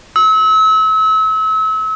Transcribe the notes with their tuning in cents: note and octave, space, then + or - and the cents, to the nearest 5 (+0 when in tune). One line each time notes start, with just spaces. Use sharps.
E6 -35